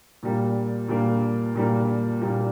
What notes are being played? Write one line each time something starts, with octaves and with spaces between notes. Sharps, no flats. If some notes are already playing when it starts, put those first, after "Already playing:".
A#2 G3 A#3
A#2 G3 A#3
A#2 G3 A#3
A#2 G3 A#3